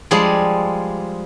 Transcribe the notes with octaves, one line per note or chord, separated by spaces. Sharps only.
F3 G3 G#3 G#4